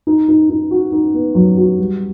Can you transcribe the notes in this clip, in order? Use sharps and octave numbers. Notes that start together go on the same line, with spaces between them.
D#4
D#4
D#4
F#4
D#4
B3
F#3
F#4
G3